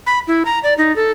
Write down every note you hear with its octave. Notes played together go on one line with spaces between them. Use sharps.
B5
E4
A#5
D5
D#4
A4